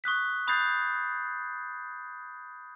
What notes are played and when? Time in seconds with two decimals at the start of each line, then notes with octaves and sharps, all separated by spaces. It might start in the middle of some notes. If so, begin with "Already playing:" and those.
0.04 C#6 D#6 F#6 B6
0.48 B5 D#6 F#6 G6 A6 C7